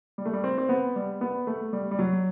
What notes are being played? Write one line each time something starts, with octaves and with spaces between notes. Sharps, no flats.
G3
A3
G3
C4
C4
B3
G3
B3
A3
G3
G3
F#3